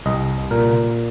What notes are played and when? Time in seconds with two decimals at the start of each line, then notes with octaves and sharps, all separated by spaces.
0.06 C2 D#5
0.51 A#2 A#4